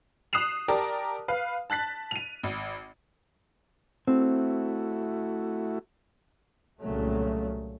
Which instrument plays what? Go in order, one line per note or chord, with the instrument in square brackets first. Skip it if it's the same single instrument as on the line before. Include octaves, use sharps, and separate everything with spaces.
[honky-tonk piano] D#6 F#6 C7 E7 F7
G4 A#4 D5 A5
B4 F5
A5 F#6 A6 B6
D#7 F7
G#1
[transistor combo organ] A3 E4 F#4 [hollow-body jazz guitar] C4
[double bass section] C2 A#2 C#3 F#3 A3